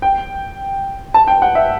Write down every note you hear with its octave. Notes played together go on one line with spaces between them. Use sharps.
G5
A5
G5
F#5
E5